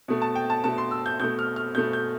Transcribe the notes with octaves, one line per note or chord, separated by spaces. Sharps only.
B2 A3
A5
G5
A5
B2 A3 A5
C6
E6
G6
B2 A3 G6
F6
F6
B2 A3 G6
G6